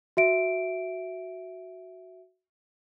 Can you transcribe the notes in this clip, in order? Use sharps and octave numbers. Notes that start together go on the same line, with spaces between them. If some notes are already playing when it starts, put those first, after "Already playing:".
F#4 E5 D7